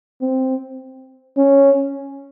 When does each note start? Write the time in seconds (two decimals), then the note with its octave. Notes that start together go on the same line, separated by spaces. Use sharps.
0.21 C4
1.37 C#4